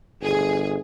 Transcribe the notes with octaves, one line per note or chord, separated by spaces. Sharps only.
G1 G#4